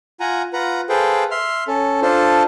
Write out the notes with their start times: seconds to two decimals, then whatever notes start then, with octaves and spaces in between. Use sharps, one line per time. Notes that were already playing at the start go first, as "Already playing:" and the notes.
0.20 F4 F#5 G#5 A#5
0.53 F4 B4 F#5 A#5
0.89 G#4 A4 B4 C5 F5 G5
1.31 E5 C6 F6
1.68 C#4 A4
2.02 D4 F4 A4 C5